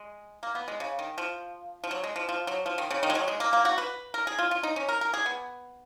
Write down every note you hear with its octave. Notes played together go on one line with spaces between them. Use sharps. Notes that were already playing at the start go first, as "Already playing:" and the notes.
Already playing: G#3
A#3
B3
G#3
C#3
D#3
F3
F3
F#3
G#3
F3
F3
F#3
F3
D#3
C#3
D#3
G#3
F#3
G#3
A#3
A#3
F#4
B4
A#4
G#4
F4
F4
D#4
C#4
A#4
A#4
G#4
B3